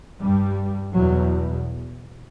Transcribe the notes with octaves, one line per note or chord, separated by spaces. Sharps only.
G2 G3
E2 B2 F#3